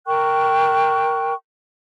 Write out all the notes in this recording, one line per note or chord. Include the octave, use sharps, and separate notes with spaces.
A#4 G5 C#6 F#6